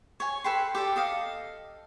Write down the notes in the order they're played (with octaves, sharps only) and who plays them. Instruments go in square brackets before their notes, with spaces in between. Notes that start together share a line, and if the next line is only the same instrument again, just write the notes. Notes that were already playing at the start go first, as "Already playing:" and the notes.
[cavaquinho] C#5 G#5
A4 B4 G5 C6
G4 A4 D5
A4 D#5 F5